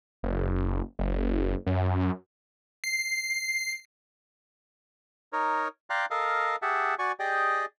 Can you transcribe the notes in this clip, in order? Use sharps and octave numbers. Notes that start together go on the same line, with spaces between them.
F#1
F#1
F#2
C7
D#4 A#4 C#5
D5 F5 G5 A#5 C6 F#6
A4 A#4 D#5 F5
G4 G#4 E5 F#5 A5
F#4 D5 G#5 C#6
G4 G#4 D5 D#5 G5